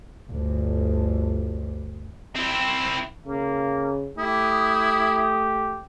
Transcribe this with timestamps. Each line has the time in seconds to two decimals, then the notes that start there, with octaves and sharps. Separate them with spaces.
0.31 G1 D2
2.35 C4 E4
3.26 C#3 A#3
4.18 A3 E4 G4 D#6